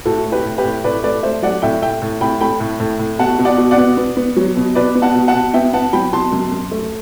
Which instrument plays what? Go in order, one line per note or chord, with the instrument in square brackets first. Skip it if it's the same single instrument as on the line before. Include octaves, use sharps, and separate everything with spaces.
[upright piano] A2 F#4 A4
A3
G4 B4
A2
G4 B4
A2
A2 B4 D5
A3 B4 D5
A3 C5 E5
F#3 D5 F#5
A2 E5 G5
A2 E5 G5
A2
A2 G5 B5
A3 G5 B5
A2
A2
A2
B2 F#5 A5
B2
D5 F#5
B2
D5 F#5
B3
B3
B3
F#3
B2
B2 B4 D5
B3
F#5 A5
B2
F#5 A5
B2
B3 E5 G5
B3 F#5 A5
F#3 G5 B5
B2 A5 C6
F#2
F#2
A3